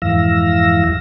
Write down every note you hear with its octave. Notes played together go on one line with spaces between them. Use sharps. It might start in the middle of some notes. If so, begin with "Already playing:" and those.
F2 G#2 E3 F5 E6 A#6